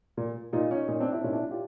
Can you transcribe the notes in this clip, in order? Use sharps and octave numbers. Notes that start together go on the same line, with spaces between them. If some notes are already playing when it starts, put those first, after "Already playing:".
A#2
A#2 D#4 F4
C#4 D#4
A#2 C#4 D#4
C4 D4
D4 E4
A#2 C#4 D#4
D4 E4
F4 G4